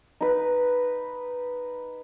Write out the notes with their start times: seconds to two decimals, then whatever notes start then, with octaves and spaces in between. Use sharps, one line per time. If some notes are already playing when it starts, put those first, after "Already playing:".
0.21 D#4 B4